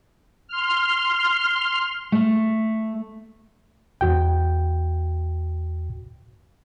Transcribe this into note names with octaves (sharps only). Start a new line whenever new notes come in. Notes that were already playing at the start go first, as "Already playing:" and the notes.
C6 F6
A3
E2 F#4 G5